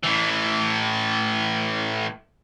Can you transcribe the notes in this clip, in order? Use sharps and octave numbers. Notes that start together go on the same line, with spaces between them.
A2 E3